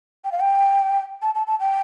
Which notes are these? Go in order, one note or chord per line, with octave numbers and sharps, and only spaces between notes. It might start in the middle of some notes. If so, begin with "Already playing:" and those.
G5
F5
G5
A5
A5
A5
G5